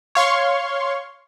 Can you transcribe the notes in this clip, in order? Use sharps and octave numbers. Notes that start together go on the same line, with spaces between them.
C#5 F5 C6 C#6